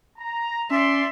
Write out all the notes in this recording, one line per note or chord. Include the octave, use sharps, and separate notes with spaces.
A#5
C#4 D5 E5 C6